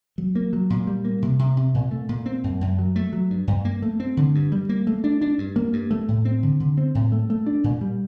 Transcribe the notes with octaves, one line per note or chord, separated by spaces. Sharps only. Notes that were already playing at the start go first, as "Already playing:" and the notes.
F#3
A#3
F#3
A#2
G3
A#3
C3
C3
C3
A#2
A3
A#2
C4
F#2
F#2
F#3
A3
F#3
G2
G2
A#3
A3
C4
D3
G2
G3
A#3
A3
D4
D4
G2
A#3
G2
A3
A2
C4
D3
D3
C4
A2
A3
A3
D4
A#2
G3